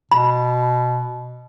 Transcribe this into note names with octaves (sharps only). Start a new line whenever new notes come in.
B2 B5